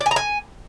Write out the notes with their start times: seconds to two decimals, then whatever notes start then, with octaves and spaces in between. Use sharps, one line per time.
0.01 D5
0.06 G#5
0.11 A#5
0.16 G#5